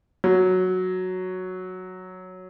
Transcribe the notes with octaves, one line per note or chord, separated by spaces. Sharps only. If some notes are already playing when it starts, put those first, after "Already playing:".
F#3